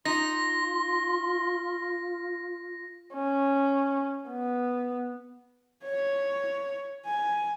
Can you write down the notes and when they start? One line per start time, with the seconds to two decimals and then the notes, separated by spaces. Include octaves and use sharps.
0.05 D#4 F4 C6 A#6
3.14 C#4
4.29 B3
5.84 C#5
7.06 G#5